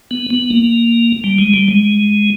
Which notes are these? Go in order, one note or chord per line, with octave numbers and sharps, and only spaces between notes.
B3
B3
A#3
G3
G#3
G3
G#3